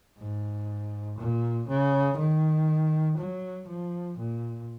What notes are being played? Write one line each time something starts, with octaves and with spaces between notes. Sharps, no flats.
G#2
A#2
C#3
D#3
F#3
F3
A#2